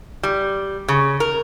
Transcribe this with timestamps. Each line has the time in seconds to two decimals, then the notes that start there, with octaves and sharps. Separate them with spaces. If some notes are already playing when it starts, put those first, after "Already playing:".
0.23 G3
0.88 C#3
1.20 A#4